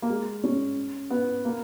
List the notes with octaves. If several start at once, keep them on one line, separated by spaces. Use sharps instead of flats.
A#3
G#3
C#4
B3
A#3